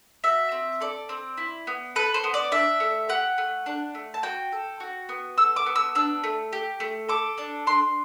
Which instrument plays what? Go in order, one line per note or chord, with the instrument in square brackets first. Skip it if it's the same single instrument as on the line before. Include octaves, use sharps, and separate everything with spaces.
[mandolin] F#4 E5
C4
A4 D5
C4
E4
B3
A4 B4
C5
B3
D5
D4 E5
A3
G4 F#5
A3
D4
A3
A5
F#4 G5
A4
F#4
B3
A4 E6
D6
B3
E6
D4 E6
A3
G4
A3
A4 D6
D4
D4 C6